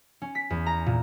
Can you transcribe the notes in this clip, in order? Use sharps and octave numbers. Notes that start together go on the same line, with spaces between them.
C#4
B6
E2
A#5
A#2